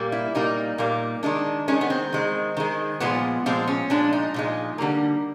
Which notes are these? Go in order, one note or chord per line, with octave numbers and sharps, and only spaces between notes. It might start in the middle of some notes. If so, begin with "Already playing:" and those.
Already playing: A#2 G3 A#3
E4
A#2 G3 A#3 D#4
A#2 G3 A#3
D#3 G#3 D4
D#3 G#3 C#4
B3
C4
D#3 G#3
D#3 G#3
A#2 F3 G#3 B3
A#2 F3 G#3 C4
C#4
A#2 F3 G#3 D4
D#4
A#2 F3 G#3
D3 G3 A#3